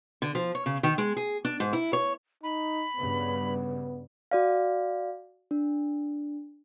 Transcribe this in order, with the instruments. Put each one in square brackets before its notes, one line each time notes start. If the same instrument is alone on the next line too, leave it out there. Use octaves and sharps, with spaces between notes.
[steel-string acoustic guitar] D3
F3
C#5
C#3
D#3
G#3
G#4
D4
G#2
E4
C#5
[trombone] D#4 [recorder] B5
[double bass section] G2 C#3 [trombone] B3
[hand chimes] F#4 D5 F5
D4